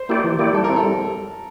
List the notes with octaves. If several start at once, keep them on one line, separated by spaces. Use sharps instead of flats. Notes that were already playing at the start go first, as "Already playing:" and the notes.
Already playing: C5
A#3 E4 G4 D5
E3
A#3 E4 G4 D5
G3 A4
A#4
C4 E4
A4
G3